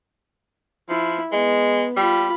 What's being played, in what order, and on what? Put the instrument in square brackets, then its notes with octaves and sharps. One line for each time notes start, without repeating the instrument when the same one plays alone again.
[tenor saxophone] F3 [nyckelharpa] E4
[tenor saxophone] G#3 [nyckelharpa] B3
[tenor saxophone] G3 [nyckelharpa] F4 B5